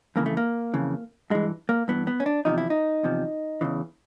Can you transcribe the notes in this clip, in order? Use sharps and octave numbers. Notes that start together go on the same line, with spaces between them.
F2 C#3 E3 A#3
A3
A#3
F2 C#3 E3
G2 E3 G#3
A#3
G2 E3 B3
B3
C#4
D4
E2 C3 F3 D#4
E4
D#4
E2 C3 F3
E2 C#3 E3